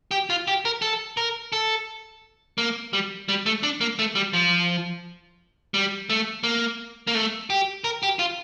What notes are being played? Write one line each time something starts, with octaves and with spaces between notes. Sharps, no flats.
G4
F4
G4
A#4
A4
A#4
A4
A#3
G3
G3
A3
D4
A#3
A3
G3
F3
G3
A3
A#3
A#3
A3
G4
A#4
G4
F4